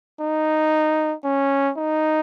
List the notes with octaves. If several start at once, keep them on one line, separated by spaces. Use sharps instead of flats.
D#4
C#4
D#4